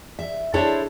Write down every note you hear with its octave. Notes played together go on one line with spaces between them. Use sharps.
E5
D4 E4 A4 C5 C#5 E5